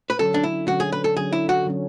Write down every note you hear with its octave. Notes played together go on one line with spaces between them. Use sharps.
B4
D3 F#3 C#4 A4
D4
E4
D3 F#3 C#4 F#4
G#4
B4
A4
D3 F#3 C#4 G#4
E4
F#4
D3 F#3 C#4